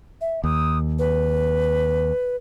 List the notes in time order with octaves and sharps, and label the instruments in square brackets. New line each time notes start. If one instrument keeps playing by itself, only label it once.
[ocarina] E5
[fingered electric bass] D#2 [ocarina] D#6
[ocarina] B4